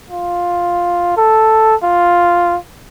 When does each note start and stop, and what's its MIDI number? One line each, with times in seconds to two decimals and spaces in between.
0.10 1.14 65
1.17 1.75 69
1.83 2.57 65